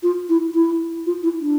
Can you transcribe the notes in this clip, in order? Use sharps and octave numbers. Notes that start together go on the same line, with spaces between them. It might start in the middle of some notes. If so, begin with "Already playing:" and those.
F4
E4
E4
F4
E4
D4